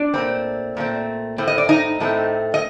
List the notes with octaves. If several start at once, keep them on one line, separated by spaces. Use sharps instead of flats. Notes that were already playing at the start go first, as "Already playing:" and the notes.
Already playing: D4 D5
A#2 A3 C4
A#2 A3 C4
A2 A3 C4
D#5
D5
D#4 D#5
A2 A3 C4
D#5